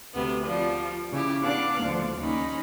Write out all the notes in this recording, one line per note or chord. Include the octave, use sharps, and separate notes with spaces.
D2 C3 B3 B4
F3 G3
C#3 E4 G4
B3 D4 F5 D6 F#6
D2 F3
D#2 C#4 D#4 B5